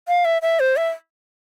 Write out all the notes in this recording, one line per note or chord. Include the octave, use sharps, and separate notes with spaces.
F5
E5
E5
C5
E5